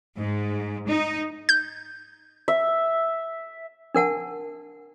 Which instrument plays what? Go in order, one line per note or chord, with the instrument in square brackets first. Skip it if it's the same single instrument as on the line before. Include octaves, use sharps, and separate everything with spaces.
[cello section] G#2
D#4
[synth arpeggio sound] G6
[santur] E5
[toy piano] D4 A#4 F#5 A5